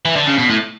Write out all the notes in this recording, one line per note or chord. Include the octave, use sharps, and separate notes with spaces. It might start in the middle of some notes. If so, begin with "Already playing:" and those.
E3
D3
C#3
B2
A2